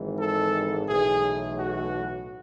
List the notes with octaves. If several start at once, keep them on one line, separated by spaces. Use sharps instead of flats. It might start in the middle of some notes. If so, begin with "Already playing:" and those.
Already playing: G#1 G#2 E3
A4
B1 A2 E3 A3 G#4
F#4